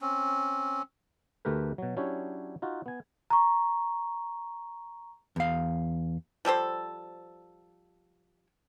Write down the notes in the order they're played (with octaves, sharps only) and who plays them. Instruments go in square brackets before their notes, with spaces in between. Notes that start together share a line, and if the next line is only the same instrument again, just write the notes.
[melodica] C4 C#4
[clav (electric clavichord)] D2 A3 G4 A#4 B4
B2 F#3
F#3 C#4 D4 E4 G4 C#5
D#4 F4 F#4
B3 G#5
[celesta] A#5 C#6
[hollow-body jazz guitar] E2 F5
[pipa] F3 G3 A4 C5